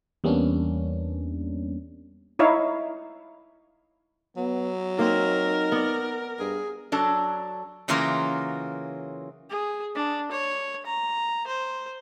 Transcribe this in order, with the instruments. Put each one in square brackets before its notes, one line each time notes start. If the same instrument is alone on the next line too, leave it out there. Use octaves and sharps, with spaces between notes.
[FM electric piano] E2 G3 A#3 B3 C#4 D4
[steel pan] D#4 E4 C#5 F5
[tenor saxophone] F#3 [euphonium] B3
[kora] A#3 C4 [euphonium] D#4 [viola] A#4
[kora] B3 D5
[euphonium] G2 [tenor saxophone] G#4
[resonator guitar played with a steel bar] F#3 D4 A4
[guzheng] C#3 E3 F#3 A#3 F4 A#4
[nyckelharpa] G#4
D4
C#5
A#5
C5